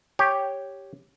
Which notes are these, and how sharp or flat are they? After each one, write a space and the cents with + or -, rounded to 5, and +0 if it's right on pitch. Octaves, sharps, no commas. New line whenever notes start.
G4 +0 C#5 +0